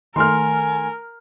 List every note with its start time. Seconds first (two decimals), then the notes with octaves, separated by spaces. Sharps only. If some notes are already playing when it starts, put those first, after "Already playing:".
0.16 D#3 A3 A#4 G#5 C6 F6